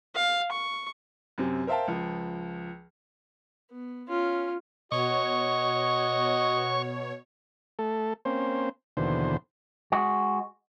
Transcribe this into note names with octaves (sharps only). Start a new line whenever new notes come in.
F5
C#6
F#2 C3 C4
A#4 C5 E5 F5 G5 A5
C#2 F3
B3
C#4 F4
B2 F#4 C#5 D#5 C#6
A3 A4
A#3 C4 C#4 C5
D#2 B2 D3 E3 C5
G#3 F#4